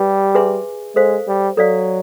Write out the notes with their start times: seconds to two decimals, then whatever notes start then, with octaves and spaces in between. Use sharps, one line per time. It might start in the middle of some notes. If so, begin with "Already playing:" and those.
Already playing: G3 G4 B4
0.35 G#4 B4 E5 G#5 C6
0.96 G#3 A4 C5 F5
1.27 G3
1.57 F#3 A4 D5 F5